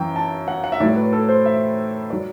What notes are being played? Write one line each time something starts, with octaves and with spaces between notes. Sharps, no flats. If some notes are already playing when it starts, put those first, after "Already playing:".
Already playing: F#2 E3 G5
A5
F#5
F#5
E5
A2 F#3 D5
B4
A4
C5
E5
F#3 D5